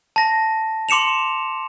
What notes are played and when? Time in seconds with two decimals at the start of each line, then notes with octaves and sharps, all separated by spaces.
0.16 A5 A#6
0.89 C6 D6 C#7 E7 F7